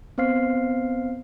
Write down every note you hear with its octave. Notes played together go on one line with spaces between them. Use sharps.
B3 C4 C5 F5 F6 C7